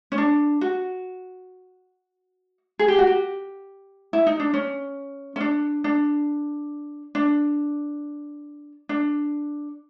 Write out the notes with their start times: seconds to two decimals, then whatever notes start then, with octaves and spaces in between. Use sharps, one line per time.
0.12 C#4
0.18 D4
0.61 F#4
2.79 G#4
2.88 G4
2.98 F#4
3.07 G4
4.13 E4
4.27 D#4
4.40 D4
4.54 C#4
5.36 C#4
5.40 D4
5.84 D4
7.15 D4
8.89 D4